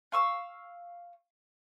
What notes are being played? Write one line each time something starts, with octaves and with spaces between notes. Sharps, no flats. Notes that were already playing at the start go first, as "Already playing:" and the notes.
F5 C#6 E6